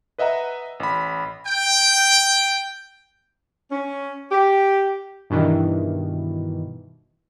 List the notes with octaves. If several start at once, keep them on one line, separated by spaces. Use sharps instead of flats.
B4 D#5 E5 F#5 A#5
A1 B5
G5
C#4
G4
G2 B2 D#3 E3